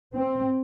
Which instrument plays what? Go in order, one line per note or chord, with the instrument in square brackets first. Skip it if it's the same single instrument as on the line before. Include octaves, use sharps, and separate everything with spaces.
[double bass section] C4